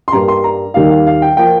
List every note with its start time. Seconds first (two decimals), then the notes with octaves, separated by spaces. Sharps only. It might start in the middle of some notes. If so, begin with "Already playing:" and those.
0.08 C6
0.12 G2 G3 A#3 A#5
0.28 C6
0.44 A#5
0.74 D#2 D#3 G3 A#3 F5
0.90 F5
1.07 F5
1.22 G5
1.37 F3 A#3 G5